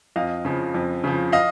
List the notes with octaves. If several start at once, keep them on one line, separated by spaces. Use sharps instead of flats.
F2 D#5 F5
C#3 F3
F2
C#3 F3
D#5 F5